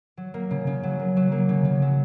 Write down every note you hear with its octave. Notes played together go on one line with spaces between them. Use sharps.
F#3
A#3
C#3
C#3
F#3
A#3
F#3
A#3
C#3
C#3
F#3